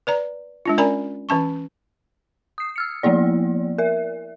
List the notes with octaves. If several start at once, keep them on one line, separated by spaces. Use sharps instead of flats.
B4 D5 A#5
G#3 D4 F4
C#4 A#4 D5 G#5 A#5 B5
E3 C#4 A5 C#6
D#6 C7
E6 F6 C#7
F3 A#3 B3 E4 D5
A#4 E5